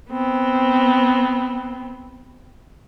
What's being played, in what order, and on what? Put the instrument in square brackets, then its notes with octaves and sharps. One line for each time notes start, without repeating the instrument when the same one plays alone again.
[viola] B3 C4